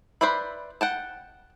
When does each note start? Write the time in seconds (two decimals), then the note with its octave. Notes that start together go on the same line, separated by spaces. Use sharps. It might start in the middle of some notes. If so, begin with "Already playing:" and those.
0.21 B4 C5 D5 E5 B5
0.81 F#5 G5 A5